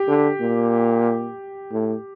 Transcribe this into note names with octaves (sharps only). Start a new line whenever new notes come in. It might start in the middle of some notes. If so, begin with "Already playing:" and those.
Already playing: G4
D3
A#2
A2